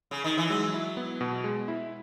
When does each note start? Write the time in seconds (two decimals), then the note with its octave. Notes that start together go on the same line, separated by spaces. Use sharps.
0.11 C#3
0.24 D#3
0.38 E3
0.50 F#3 G#3
0.74 E4
0.97 B3
1.21 B2
1.44 G#3
1.68 E4